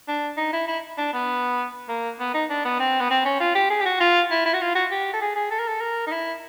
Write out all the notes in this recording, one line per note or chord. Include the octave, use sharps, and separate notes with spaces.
D4
D#4
E4
E4
D4
B3
A#3
B3
D#4
D4
B3
C4
B3
C4
C#4
F4
G4
G#4
G4
F#4
F4
E4
E4
F#4
F4
F#4
G4
A4
G#4
G#4
A4
A#4
A4
A#4
D#4
E4